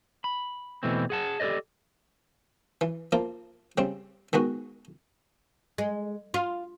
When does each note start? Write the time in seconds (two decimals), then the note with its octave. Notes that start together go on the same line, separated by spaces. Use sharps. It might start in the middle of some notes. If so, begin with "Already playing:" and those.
0.24 B5
0.83 B2 E3 A3 C4
1.10 G#4 F#5 A5
1.40 G4 A4 C5 D5 D#5
2.81 E3
3.12 F3 A#3 F4
3.78 C#3 G3 C4
4.33 D#3 G#3 B3 F#4
5.78 G#3
6.34 F4